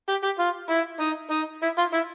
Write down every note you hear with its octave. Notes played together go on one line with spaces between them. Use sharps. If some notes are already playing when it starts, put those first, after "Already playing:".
G4
G4
F4
E4
D#4
D#4
E4
F4
E4